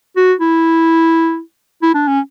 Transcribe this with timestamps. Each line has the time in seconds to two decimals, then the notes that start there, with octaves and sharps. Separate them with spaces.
0.16 F#4
0.40 E4
1.82 E4
1.94 D4
2.08 C#4